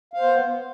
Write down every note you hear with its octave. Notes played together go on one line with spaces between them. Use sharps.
B3 C5 F5